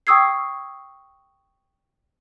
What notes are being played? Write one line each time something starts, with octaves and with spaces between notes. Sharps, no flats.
G5 C#6 D#6 E6 G#6 C7